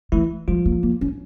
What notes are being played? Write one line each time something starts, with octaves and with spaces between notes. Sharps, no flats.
E3 A3 E4
F3 G3 F4
A#3
A#3
C#4